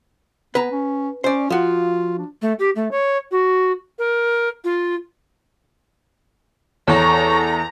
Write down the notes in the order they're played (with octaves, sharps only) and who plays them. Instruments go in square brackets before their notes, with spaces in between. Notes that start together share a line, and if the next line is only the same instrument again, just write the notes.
[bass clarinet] B3 [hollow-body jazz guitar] B4 G#5 A#5
[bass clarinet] C#4
[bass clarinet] C#4 [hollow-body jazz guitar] C5 D5
[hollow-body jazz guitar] F3 F#4 [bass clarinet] F4
[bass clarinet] D4
[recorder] A3
G4
A3
C#5
F#4
A#4
F4
[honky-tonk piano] E2 [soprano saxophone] A4 [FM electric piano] C#5 C#6 [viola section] A#5